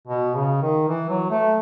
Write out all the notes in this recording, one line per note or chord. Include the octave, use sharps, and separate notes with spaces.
B2
C#3
D#3
E3
F#3
A3